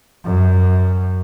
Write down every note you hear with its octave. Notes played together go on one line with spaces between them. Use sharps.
F#2